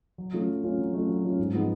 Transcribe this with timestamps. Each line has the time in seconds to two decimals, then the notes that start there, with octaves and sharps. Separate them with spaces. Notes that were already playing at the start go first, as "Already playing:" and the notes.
0.18 F#3
0.33 A3 C#4 F4
0.48 F#3
0.64 A3 C#4 F4
0.78 F#3
0.93 A3 C#4 F4
1.09 F#3
1.24 A3 C#4 F4
1.39 G#2
1.54 F3 G#3 B3 D#4